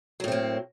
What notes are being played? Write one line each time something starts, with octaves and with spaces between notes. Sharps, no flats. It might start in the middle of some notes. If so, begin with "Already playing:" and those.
A2 F#3 A#3 C4